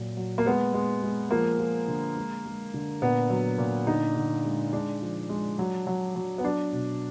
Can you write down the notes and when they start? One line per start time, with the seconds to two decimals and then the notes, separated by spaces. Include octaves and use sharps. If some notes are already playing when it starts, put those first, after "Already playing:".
Already playing: A#2 F#3
0.17 F#3
0.38 A#3
0.46 G#3 B3
0.74 G#3
1.03 G#3
1.31 F3 A#3
1.59 F3
1.88 D3
2.16 G#3
2.46 G#3
2.74 D3
3.02 A#2 B3
3.30 F#3
3.58 A#2
3.87 D3 D#4
4.16 D3
4.45 G#3
4.73 G#3 D4
5.02 F3
5.29 G#3
5.59 F#3
5.87 F#3
6.16 F#3
6.38 B3
6.44 F#3 D4
6.72 B2